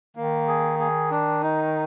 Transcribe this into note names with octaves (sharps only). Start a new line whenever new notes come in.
D#3 A#3
G#4
G#4
D4
D#4